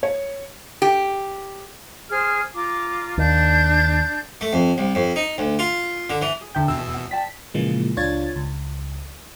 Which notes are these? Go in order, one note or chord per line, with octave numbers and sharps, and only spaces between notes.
C#5
G4
G#4 C5 F6
F4 A#5 D6
D#2 D4 A5 G6
A3
F2
C2
F2
D#4
D2
F4
D3
E3
G#4
E2 D3 A4 E5 G5 G6
E2 B2 E6
F#5
D5 G5 A5 B6
A#2 C#3 E3 F3 G#3 A#3
C#2 D4 F4 C#5 G#6 A6
C#2